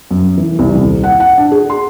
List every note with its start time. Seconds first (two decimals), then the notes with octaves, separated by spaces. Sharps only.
0.11 F#2
0.38 E3
0.59 C2
0.75 D#1
1.04 F#5
1.20 F#5
1.37 D4
1.52 G#4
1.70 C6